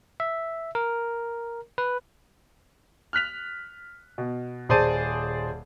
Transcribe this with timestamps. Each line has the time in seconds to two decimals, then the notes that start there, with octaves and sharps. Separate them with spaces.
0.20 E5
0.75 A#4
1.78 B4
3.13 F6 F#6 B6 F7
4.18 B2
4.69 D#1 G#4 C5 D5 A5 D#7